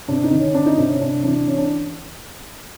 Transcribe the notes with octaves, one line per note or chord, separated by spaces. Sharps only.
C3 D4
D#4
D#3
C#4
D#3 D4
D#4
C3 D4
C#4
C3 D4
E3 D4
E3 C#4
D4